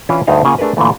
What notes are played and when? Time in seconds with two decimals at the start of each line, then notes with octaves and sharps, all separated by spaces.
0.09 E3 C#4 D4 E4 F4
0.27 D2 G2 D#4 F5 G#5
0.45 C#3 A#3 F4 F#5 G#5
0.58 A3 D4 G#4 A#4 B4
0.77 A#2 D3 E3 A3